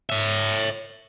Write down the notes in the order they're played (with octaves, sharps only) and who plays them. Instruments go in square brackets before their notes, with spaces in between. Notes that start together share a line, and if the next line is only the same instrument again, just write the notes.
[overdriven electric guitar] C#5 E5